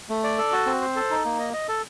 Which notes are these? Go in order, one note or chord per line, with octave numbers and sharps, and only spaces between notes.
A3
D5
A4
F#4
C4
C5
A4
D#4
A#3
D#5
D#5
A4